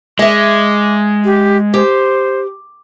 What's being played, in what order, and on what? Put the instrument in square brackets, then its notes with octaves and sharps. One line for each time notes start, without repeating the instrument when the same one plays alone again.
[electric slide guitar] G#3 [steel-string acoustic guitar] D#5 E5 [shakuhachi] D6
[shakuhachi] G4
[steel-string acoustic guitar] G4 [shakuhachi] C5